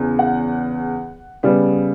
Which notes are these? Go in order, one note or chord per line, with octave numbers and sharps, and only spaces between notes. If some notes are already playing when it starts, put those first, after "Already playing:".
Already playing: E2 C#3
F#5
C#3 G3 B3